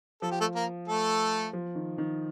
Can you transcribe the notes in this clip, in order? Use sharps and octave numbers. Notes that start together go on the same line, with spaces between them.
F3 A4
G4
A3 A4
A#3 A#4
A3 A4
F3
D#3
D#3